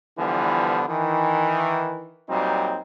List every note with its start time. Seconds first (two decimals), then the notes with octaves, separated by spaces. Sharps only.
0.17 D3 E3 F3 G3 B3
0.88 D#3 E3
2.29 A#2 F#3 G3 C4 D#4